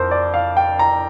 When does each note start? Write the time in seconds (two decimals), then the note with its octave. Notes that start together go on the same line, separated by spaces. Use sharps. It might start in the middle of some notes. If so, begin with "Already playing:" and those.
Already playing: F2 A#4 C5
0.11 D5
0.34 F5
0.57 G5
0.79 A#5